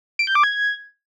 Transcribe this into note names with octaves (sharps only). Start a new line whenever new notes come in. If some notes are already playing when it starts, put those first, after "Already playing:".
D7
G6
D6
G#6